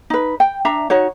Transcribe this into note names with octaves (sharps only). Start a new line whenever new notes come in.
D#4 B4
G5
D4 E5 A#5
D#4 F#4 C#5